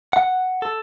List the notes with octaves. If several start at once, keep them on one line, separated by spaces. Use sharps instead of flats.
F#5
A4